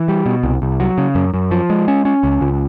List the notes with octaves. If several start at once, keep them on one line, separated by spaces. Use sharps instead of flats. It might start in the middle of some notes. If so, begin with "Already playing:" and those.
Already playing: E3
G3
B2
C2
C2
F#3
C#3
F#2
F#2
F3
G#3
C#4
C#4
C#2
C#2